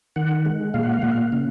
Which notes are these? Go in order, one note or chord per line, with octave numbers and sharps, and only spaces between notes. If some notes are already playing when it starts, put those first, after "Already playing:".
D#3 F#5
G#3
A#2 F5
F#5
F5
A#2 F#5
F5
C#3